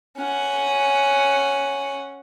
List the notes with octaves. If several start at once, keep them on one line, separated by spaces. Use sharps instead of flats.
C#4 F#5